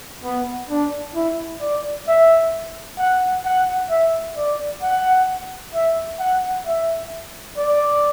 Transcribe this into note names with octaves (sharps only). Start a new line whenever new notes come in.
B3
D4
E4
D5
E5
F#5
F#5
E5
D5
F#5
E5
F#5
E5
D5